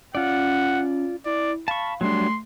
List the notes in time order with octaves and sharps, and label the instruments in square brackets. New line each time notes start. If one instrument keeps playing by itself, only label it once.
[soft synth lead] C#4 [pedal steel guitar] F4 D5 [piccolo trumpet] F#5
[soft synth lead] E4 [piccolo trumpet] D5
[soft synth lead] F5 [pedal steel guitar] A5 C#6 [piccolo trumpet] B5
[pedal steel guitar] F#3 G3 D4 [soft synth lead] A3 [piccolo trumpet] C6